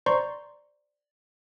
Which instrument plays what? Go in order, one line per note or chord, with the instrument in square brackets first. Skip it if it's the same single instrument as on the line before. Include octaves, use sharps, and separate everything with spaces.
[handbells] C5 D5 A#5 C6 C#6